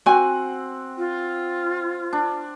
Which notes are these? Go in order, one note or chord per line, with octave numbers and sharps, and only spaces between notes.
C4 F#4 F#5 G#5
F4
D4